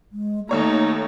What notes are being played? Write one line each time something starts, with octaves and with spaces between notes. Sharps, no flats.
G#3
D#2 A3 A#3 D#4 C#5 A#5